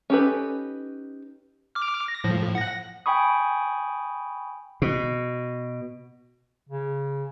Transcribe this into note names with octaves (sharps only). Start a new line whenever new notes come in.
C#4 D#4 G4 A4 B4
D6 F6
A#6
A2 F3
F#5 A#6
G5 G#5 B5 C#6 D#6
B2
C#3